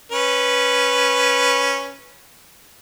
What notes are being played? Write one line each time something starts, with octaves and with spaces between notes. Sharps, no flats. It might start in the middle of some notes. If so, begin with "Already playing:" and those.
C#4 B4